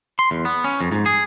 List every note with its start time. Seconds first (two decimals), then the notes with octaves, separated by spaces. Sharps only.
0.19 C6
0.31 E2
0.45 B3
0.64 C#4
0.81 F2
0.92 G#2
1.06 G#4